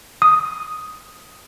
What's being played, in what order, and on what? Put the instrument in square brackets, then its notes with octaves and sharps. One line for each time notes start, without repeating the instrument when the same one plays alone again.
[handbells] D#6